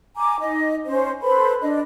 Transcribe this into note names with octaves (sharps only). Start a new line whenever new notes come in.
G#5 A#5 D6
D#4 D#5
C#4 C5
A4 B4 C5 B5
D4 D#5